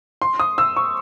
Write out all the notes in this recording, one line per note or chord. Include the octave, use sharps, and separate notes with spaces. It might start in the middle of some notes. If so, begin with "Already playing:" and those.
C6
D#6
E6
C#6